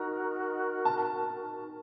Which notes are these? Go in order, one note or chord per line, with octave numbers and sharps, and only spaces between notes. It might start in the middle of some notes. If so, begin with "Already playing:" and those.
Already playing: D#4 F#4 A#4 A#5
A5